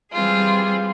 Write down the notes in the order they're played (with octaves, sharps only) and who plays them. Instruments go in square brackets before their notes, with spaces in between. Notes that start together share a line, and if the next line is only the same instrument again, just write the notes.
[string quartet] E3 G3 C4 F4 G#4